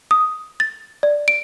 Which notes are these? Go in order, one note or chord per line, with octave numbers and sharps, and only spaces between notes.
D#6
A6
D5
D7